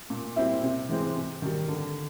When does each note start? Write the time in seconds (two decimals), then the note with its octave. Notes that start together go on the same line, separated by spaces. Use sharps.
0.10 A#2
0.36 G3 C4 E4
0.63 C3
0.89 E3 G#3 C4
1.16 C3
1.42 D#3 G3
1.69 D3